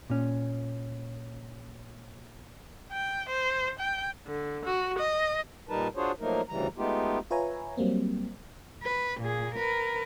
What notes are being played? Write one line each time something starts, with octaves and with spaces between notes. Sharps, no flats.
A#2 C#4
G5
C5
G5
D3
F#4
D#5
A#2 G3 D#4 A#4 B4 A5
D4 F4 F#4 G#4 C5 C#5
F3 F#3 A3 A#3 D#4 A#4
D2 C#3 E3 G3 A#5
G#3 A3 B3 D#4 F4 G4
F4 B4 C#5 E5 G#5 A#5
F#3 G3 A#3 C4
B4
A#2 G#4
A#4 B4